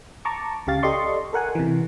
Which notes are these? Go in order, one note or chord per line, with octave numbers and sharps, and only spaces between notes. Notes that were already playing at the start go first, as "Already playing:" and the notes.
A5 A#5 C#6 D6
C#2 C#3 G4 F5 A6
G4 A4 D5 D#5 C6 C#6
A4 A#4 F#5 G#5
C3 E3